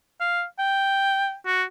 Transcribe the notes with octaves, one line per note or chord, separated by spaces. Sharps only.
F5
G5
F#4